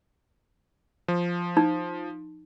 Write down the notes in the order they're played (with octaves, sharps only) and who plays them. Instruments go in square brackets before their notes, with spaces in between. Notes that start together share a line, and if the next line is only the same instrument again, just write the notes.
[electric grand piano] F3
[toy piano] D#4